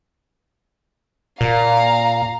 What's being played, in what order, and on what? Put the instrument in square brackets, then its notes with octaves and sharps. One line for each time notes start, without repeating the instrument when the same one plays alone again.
[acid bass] A#2 [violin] F5 A#5